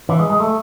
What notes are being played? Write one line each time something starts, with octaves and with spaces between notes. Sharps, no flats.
E3
G#3
G#3
A3